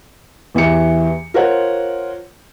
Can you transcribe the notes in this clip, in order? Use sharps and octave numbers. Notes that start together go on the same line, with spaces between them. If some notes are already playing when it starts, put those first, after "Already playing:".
E2 E3 G4 C#7
F4 A#4 C5 C#5 F#5